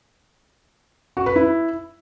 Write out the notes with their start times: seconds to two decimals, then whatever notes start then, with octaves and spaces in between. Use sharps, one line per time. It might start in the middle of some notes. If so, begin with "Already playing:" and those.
1.17 F#4
1.26 B4
1.36 E4